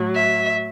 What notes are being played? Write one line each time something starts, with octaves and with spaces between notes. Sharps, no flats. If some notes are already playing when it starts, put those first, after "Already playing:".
Already playing: A2 F#3
E5